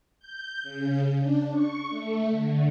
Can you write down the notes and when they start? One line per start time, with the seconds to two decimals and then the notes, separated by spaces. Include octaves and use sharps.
0.19 G6
0.63 C#3
1.20 D4
1.53 C#6
1.90 A3
2.30 D3